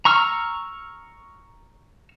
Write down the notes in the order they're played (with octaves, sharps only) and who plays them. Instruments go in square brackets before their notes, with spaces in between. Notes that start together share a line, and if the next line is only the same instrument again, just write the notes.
[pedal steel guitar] A#5 C#6 E6 F6